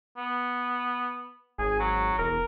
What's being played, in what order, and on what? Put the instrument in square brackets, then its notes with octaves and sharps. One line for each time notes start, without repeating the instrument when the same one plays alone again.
[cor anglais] B3
[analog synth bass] G#1 [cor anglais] G#4
[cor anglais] F#3
[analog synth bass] E1 [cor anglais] A#4